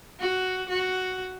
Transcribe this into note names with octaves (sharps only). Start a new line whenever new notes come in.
F#4
F#4